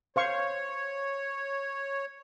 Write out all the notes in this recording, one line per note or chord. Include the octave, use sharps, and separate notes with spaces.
C5 C#5 F5 C#6